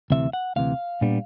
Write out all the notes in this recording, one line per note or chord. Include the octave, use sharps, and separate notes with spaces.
D2 C3 E3 E5
F#5
D2 C3 E3 F5
A#2 G3 B3 D4